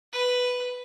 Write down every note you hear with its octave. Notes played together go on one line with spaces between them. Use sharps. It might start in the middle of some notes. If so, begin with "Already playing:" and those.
B4